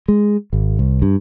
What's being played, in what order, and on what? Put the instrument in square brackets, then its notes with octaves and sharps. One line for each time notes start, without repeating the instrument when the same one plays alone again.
[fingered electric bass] G#3
G#1
C2
G2